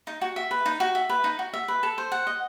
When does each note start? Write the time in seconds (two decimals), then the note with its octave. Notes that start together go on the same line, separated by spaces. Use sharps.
0.07 D#4
0.21 F#4
0.36 E5
0.51 B4
0.66 D#4
0.80 F#4
0.95 E5
1.09 B4
1.24 D#4
1.39 F#4
1.53 E5
1.68 B4
1.83 A4
1.98 C5
2.12 F#5
2.27 D#5